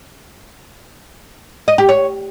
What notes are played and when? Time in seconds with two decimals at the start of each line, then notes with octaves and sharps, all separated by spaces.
1.68 D#5
1.78 G4
1.89 C#5